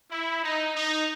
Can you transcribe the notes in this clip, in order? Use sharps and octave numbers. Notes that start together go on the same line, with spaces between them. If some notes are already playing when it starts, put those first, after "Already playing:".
E4
D#4
D#4